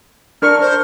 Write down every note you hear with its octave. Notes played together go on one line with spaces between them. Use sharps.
D4 A#4 C#6 F6
C5